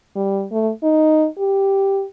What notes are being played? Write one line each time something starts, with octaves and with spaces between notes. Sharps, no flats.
G3
A3
D#4
G4